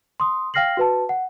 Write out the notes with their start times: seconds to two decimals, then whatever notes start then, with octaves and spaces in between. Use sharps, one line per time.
0.20 C6 D#6
0.54 F5 G5 F6 A#6 C7 F#7
0.77 F#4 B4 A5
1.09 F#5